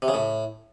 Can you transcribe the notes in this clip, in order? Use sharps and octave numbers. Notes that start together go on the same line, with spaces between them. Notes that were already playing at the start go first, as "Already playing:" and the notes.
C3
C#3
A2